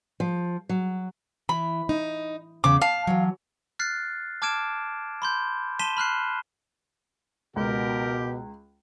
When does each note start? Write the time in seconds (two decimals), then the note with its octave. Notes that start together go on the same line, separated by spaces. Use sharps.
0.20 F3
0.69 F#3
1.49 E3 B5
1.89 D#4
2.64 E2 C#3 D6
2.81 F5 A5
3.07 E3 F#3
3.79 F6 F#6 A6 C7
4.42 A5 D6 F6 G#6 D7 E7
5.22 B5 C6 G6
5.79 A5 C6 B6 D#7 E7 G7
5.97 B5 F6 F#6 C7
7.56 C#2 B2 G4 A#4